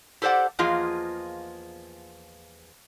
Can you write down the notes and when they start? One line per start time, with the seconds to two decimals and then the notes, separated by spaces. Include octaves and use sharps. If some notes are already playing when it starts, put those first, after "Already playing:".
0.22 G4 A4 C5 D5 F#5
0.59 E2 F3 A#3 F4 G#4 D#5